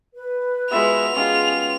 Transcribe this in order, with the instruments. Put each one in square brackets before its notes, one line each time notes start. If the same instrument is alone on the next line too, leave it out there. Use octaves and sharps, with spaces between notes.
[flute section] B4
[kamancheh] G#3 E5 [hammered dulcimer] B3 F4 F#4 [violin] F7
[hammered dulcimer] G#3 C#4 G4 [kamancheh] F4 [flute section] G#4